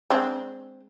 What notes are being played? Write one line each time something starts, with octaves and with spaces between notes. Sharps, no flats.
G#3 C4 D4